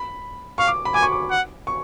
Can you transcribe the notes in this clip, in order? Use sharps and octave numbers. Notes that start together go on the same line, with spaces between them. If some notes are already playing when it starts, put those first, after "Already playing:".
Already playing: B5
F5 C#6
D6
B5
G#5 D6
C#6
D6
F#5
C#6